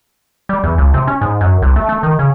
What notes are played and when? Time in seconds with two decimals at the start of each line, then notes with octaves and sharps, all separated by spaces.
0.49 G3
0.64 E2
0.78 C#2
0.94 C3
1.07 C#4
1.21 G#2
1.41 F#2
1.62 C2
1.76 A3
1.89 A3
2.03 D#3
2.19 C#3